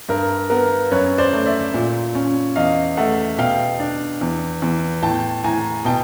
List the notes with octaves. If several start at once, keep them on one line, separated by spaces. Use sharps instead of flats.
G2 A#4
B3 A#4
F#2 B4 C#5
C5 D5
A3
D5 E5
A#2
C#4
E2 D#5 F5
A3 E5 F#5
B2 F5 G5
D4
E2
E2
A2 G5 A5
A2 G#5 A#5
B2 G5 A5